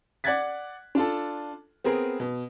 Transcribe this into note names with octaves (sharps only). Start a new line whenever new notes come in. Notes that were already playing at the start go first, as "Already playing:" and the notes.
D5 F#5 F#6 G#6 A6 B6
D4 F4 A4
B3 C4 G#4 A#4
B2